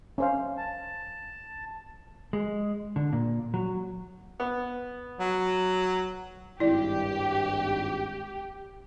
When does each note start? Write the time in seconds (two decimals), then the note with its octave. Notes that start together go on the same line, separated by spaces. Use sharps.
0.18 C#4 C5 F5
0.58 A5
2.33 G#3
2.96 D3
3.13 A#2
3.54 F#3
4.40 B3
5.19 F#3
6.60 G#1 G2 E4 G4 D5